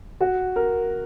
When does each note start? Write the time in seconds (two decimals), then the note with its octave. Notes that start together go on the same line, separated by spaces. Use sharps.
0.21 F#4
0.56 A#4